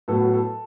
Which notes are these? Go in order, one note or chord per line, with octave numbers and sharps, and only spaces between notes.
A2 F#3 B3 A4
F#4
A4